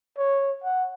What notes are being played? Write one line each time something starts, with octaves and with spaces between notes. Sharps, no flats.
C#5
F#5